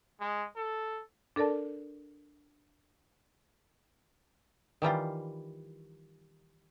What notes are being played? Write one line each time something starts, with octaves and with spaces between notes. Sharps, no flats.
G#3
A4
D4 A4 A#4 D5 A5
D#3 E3 G3 F4